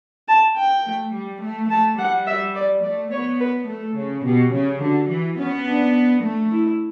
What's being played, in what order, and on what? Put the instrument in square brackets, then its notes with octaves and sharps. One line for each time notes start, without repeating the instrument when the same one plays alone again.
[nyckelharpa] A5
G5
[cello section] A3
G3
A3
[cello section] A3 [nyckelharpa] A5
[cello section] G3 [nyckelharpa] F#5
[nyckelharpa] E5
D5
[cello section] A3 [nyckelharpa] D5
[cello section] B3 [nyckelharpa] C#5
[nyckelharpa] B4
[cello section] A3 [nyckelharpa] A4
[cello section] C#3
[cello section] B2 [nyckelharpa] G4
[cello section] C#3
[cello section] D3 [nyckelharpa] F#4
[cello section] E3
[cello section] B3 [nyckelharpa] C#4
[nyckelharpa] D4
[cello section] A3
[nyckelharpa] E4